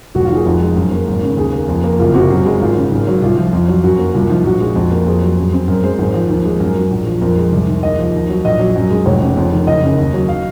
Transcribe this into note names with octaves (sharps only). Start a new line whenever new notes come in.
F1 F#4
F4
D#3 G#4
F2
G#3
F#2
A#3
G#1
C#3
D#2 G#4
A#3
F2
A#3
F#1 F4
C3 F#4
F#2
G#3
G#1 F4
C#3
G#1
F#3
C2 F4
F3
F2
F#3
F#2 F#4
A#3
C2 F4
F3 D#4
A#1 F#4
G#3
F2
A#3
F2 G#4
F#3
F#2
C4
F#2 A#4
G#3 C5
G#1 G#4
F3
D#2
G#3
F#2 A#4
F#3
A#1
F3
F2 A#4
G#3
C2
D#3
D#2 D#5
F3
D#2
F#3
A#1 D#5
F#3
F#2
G#3
F1 C#5
C#3
F2
D#3
F#1 D#5
C#3
D#2
F#3
F5